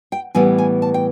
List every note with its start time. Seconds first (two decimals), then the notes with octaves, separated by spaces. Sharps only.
0.12 G5
0.35 A2 E3 G3 B3 G#5
0.58 G#5
0.82 A5
0.94 G5